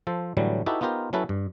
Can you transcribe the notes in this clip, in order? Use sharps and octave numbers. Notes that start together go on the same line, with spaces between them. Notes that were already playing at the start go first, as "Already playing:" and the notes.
F3 A4 C5
A2 D3 E3 F#3 G3
D#4 E4 F#4 G4 A4 B4
B3 D#4 F4 G4 A#4 C5
F#3 C#4 E4 A4 B4
G2